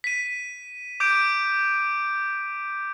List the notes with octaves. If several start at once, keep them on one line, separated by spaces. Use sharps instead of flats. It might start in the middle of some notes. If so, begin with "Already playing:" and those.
B6 D#7
D6 G6 D7